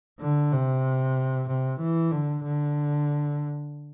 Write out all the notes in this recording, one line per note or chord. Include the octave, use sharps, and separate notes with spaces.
D3
C3
C3
E3
D3
D3